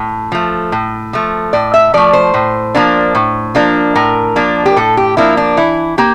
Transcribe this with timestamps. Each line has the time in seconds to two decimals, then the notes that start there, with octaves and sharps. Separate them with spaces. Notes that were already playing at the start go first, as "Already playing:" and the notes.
Already playing: A2
0.32 F3 A3
0.72 A2
1.13 F3 A3
1.53 A2 D5
1.74 E5
1.94 F3 A3 D5
2.13 C5
2.34 A2
2.75 F3 A#3 D4
3.15 A2
3.55 F3 A#3 D4
3.95 A2 A#4
4.36 F3 A#3 D4
4.66 G4
4.76 A2 A4
4.97 G4
5.17 F3 A#3 D4 E4
5.37 D4
5.57 E3 E4
5.98 A#3 G4